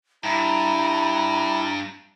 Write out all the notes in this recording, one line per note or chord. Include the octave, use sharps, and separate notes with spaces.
G2 E4 A#5